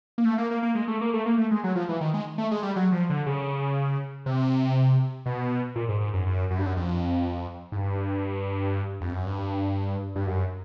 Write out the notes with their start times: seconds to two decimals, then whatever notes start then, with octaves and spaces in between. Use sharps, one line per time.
0.18 A#3
0.25 A3
0.38 A#3
0.51 A#3
0.63 A#3
0.75 G#3
0.88 A3
1.01 A#3
1.14 A3
1.26 A#3
1.38 A3
1.51 G#3
1.64 F#3
1.75 F3
1.89 E3
2.01 D#3
2.14 G#3
2.38 A3
2.51 G#3
2.63 G3
2.76 F#3
2.92 F3
3.10 D3
3.26 C#3
4.26 C3
5.26 B2
5.76 A#2
5.89 G#2
6.00 G#2
6.14 F#2
6.27 F#2
6.51 F#2
6.59 G2
6.66 F#2
6.77 F2
7.72 G#2
7.76 G2
9.01 F2
9.13 F#2
9.26 G2
10.16 G2
10.27 F#2